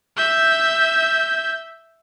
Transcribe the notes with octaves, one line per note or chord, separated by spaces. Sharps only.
E5 G6